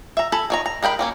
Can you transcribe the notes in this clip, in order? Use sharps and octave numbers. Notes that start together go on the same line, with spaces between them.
E5 A#5
A4 G#5 B5
D#3 C#5 A#5
A#5
G#3 A#4 G5 B5
F#3 A#3 C#4